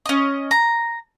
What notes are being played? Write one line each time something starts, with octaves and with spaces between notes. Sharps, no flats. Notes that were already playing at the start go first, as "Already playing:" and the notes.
C#4 D#5
A#5